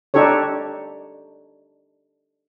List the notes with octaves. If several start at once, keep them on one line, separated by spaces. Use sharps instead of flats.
D4 D#4 G4 A4 C#5